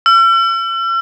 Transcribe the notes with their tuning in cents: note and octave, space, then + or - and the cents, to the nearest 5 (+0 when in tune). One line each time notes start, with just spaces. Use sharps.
E6 +45